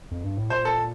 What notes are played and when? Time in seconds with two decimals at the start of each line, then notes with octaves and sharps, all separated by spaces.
0.11 F2
0.24 G2
0.37 A2
0.50 A#2 C5
0.65 A4